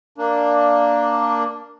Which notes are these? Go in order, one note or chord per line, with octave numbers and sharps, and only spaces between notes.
A#3 D4